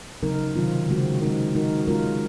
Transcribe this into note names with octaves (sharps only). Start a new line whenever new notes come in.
C#3 F#3 C4 D#4 A#4
C3 D#3 F#3 C4 F4
C#3 G#3 C4 F#4
G#3 C4 D#4 A#4
G#3 D#4 F#4 A#4
G#3 C#4 F4 A#4